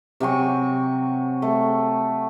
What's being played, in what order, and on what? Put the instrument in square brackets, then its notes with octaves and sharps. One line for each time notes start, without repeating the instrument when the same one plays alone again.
[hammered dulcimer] C3 F#3 G#5 C#6
A3